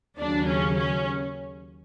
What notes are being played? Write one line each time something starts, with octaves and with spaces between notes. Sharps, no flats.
D#2 C#3 F#3 D4
C#4
C#4